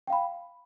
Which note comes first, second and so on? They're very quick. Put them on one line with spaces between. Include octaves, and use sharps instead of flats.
G5 F5 B5